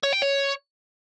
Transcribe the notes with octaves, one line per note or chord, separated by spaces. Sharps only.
C#5
G5
C#5